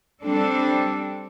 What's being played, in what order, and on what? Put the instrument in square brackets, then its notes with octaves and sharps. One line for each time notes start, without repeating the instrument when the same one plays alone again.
[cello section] G3 C4 D4 A4